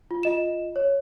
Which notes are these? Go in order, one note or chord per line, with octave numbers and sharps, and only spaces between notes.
F4
F4 D#5 E7
C#5